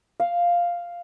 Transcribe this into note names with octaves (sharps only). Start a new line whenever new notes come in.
F5